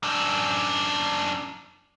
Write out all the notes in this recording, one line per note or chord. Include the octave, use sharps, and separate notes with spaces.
F#2 D4